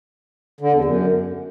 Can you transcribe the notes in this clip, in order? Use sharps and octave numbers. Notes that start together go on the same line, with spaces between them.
D3
E2
F#2